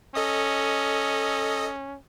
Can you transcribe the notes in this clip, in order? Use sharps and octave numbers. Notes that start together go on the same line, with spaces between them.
C#4 A4 D#5 D#6